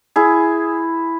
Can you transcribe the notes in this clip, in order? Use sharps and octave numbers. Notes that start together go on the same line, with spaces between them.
E4 G#4